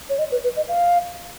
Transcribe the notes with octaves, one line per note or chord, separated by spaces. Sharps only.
C#5
D#5
B4
B4
D#5
F5